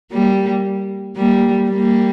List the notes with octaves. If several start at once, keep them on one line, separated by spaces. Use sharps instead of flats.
G3 A#3
G3 A#3
G3 A#3